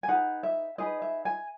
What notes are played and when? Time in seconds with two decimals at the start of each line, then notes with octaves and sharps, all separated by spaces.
0.03 G#5
0.08 D#4 G#4 B4 F#5
0.43 E5
0.78 D#4 G#4 B4 D#5
1.02 E5
1.25 G#5